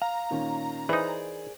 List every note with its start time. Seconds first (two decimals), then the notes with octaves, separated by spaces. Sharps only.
0.02 F5 A#5
0.30 A#2 D#3 C#4
0.89 E3 D#4 G#4 A#4 C5 D5